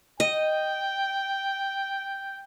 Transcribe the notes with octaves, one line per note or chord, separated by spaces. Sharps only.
D#5 G5